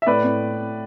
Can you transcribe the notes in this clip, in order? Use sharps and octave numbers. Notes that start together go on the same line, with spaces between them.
E5
A2 B4 D5
A2